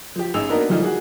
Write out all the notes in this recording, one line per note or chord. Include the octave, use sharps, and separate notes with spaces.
F3 G4
A1 D#4 G#4 E6 F7
A#3 B3 D4 D#4 F#4 A#4
E3 F3 G3 A3 D#4 F4
F#4 G#4